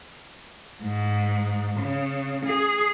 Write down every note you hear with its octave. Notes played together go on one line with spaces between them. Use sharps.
G#2
C#3
G#4